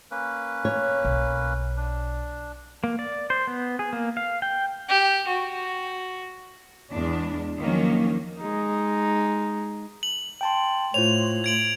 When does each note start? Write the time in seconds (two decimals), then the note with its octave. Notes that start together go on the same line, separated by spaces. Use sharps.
0.11 A#3 C#4 B4
0.65 C#5
1.04 B1
1.77 D4
2.84 A#3
2.99 D5
3.30 C5
3.47 B3
3.79 G#4
3.93 A#3
4.17 F5
4.42 G5
4.89 G4
5.27 F#4
6.92 E2 G#3 D4
7.59 D#3 F3 F#3 A#3 C#4
8.39 G#3 D#4
10.03 F#7
10.41 G5 A5 C6
10.94 A2 F4 C5 C#5 F7
11.44 G#6 D7 F#7